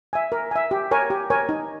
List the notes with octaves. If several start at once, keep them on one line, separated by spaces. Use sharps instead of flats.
E5 G#5
A#4
E5 G#5
G4
A#4 C#5 G#5
G4
A#4 C#5 G#5
D#4